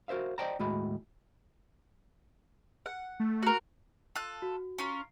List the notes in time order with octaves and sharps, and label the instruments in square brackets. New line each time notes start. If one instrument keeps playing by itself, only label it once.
[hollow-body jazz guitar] F#4 A#4 C5 E5 F5
C5 D5 D#5 G5 A5 A#5
D#2 A2 G#3 F#4 G#5 B5
[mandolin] F#5
[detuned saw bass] A3
[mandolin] F#4 A#4
F4 A4 F#6
[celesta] F#4
[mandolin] C#4 F4 A#4